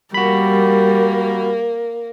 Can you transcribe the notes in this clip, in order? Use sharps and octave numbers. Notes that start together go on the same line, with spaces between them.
G3 A#3 F#4 A#4 B5